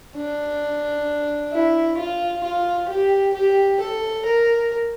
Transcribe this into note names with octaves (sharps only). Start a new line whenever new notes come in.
D4
E4
F4
F4
G4
G4
A4
A#4